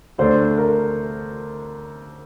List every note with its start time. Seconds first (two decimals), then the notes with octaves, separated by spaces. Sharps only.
0.18 D2 D3 A3 D4 A4 C5
0.58 A#4